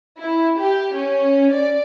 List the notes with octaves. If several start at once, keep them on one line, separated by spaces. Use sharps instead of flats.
E4
G4
C#4
D5